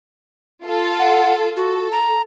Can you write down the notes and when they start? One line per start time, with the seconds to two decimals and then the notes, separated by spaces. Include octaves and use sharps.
0.65 F4 A4
0.99 F#5
1.57 F#4 A4
1.92 A#5